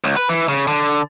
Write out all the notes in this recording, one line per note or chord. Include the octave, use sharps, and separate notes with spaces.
C#2
B4
E3
C#3
D3